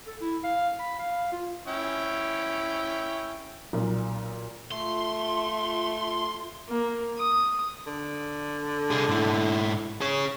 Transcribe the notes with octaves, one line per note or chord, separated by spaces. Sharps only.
A4
E4
F5
B5
F5
F4
C#4 E4 G5
B1 A#2
A3 F4 C6
A#3
D#6
D3
C2 G#4
G#2 E4
G#4 C#5